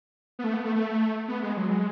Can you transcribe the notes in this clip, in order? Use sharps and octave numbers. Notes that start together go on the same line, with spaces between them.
B3
A3
B3
A3
A3
B3
G#3
F#3
G#3